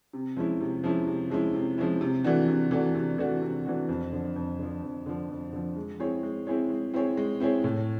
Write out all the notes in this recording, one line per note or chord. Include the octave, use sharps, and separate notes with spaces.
C3
F3 G#3 C#4 E4
C3
F3 G#3 C#4 E4
C3
F3 G#3 C#4 E4
C3
F3 G#3 C#4 E4
C3
E3 A3 D4 F#4
C3
E3 A3 D4 F#4
C3
E3 A3 D4 F#4
C3
E3 A3 D4 F#4
F2
D3 F3
F2
D3 F3
F2
D3 F3
F2
D3 F3
G#3
C4 E4 G#4 C#5
G#3
C4 E4 G#4 C#5
G#3
C4 E4 G#4 C#5
G#3
C4 E4 G#4 C#5
A2